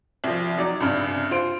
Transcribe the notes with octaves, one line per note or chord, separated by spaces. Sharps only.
C2 F3
F#3 D#4 D5
C#2 G2 C3
F4 C5 D7